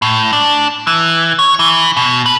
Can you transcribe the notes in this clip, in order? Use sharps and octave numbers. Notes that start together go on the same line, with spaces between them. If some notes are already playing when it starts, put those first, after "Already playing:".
A2
D4
E3
C#5
E3
B2
B4